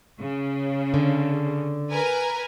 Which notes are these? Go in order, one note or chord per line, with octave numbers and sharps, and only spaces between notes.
C#3
D3
A#4 B4 G#5